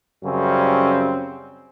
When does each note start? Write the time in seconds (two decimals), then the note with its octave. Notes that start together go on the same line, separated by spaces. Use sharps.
0.25 F#2 C#3 G3 C4 C#4